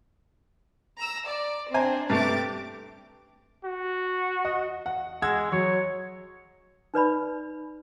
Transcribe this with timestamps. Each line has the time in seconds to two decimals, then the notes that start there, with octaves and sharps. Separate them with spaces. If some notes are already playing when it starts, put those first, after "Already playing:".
0.99 A#5 E6
1.28 D5
1.74 C4 D4 C5 G#5 A#5
2.10 G2 C3 A3 G4 D6 A6
3.65 F#4
4.45 D#5
4.86 F#5
5.22 G#3 F#5 E6 G#6
5.52 F#3 C#5
6.94 D#4 B4 D5 B5